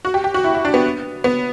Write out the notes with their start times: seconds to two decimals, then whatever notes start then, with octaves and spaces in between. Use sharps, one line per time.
0.05 F#4
0.14 G4
0.24 G4
0.34 F#4
0.44 E4
0.54 E4
0.65 D4
0.74 B3
1.24 B3